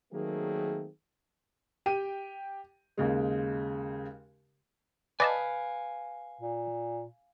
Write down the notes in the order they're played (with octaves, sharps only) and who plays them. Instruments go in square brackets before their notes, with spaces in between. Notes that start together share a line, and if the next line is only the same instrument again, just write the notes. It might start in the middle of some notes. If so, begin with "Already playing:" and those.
[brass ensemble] D#3 F#3 A3 A#3 C4 G#4
[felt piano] G4 G5 D#7
D#2 C#3 G#3
[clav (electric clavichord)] B4 [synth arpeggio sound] D5 D#5 A5 [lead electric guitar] F5 G#5
[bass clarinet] A#2